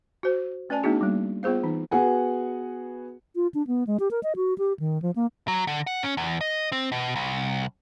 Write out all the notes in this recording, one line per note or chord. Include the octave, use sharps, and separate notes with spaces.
F#4 C5
A3 C#4 B4 D5 G#5 A5
A3 B3 D4 D#4 F#4 G#4
G3 A#3
B3 F4 G#4 C5 F5
E3 D#4
B3 F#4 G#4 F#5 G#5
F4
D4
B3
G#3
G4
A#4
D#5
F#4
G4
D#3
F3
A#3
F#3
D3
F#5
C#4
E2
D#5
C4
B2
C2